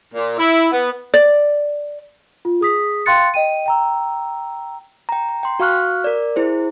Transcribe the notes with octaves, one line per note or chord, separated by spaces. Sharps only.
A#2
E4
B3
D5
F4
G#4 D#6 B6
F5 G5 C6 F#6 A6 C#7
D#5 G5 D#7
G5 A#5 E6
G5 A#5
A#5
G5 C6
F#4 F5 C#6 F6 F#6
A#4 D5
E4 G#4 C5